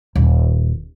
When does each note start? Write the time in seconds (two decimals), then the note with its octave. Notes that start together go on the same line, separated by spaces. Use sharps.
0.16 D#1